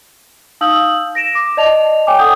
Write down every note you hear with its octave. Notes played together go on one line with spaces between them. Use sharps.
D#4 F5 D#6 E6 G6 F#7
A#6 D7 E7
D6
D5 D#5 A5 F7
C#5 G5 G#5 D6
A4 F#5 D#6 G6